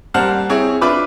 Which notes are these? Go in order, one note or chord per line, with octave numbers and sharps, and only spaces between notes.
G3 A#3 C5 F#5 A5 F6
C4 E4 G#4 C#5
D4 F4 B4 E5 B5 D6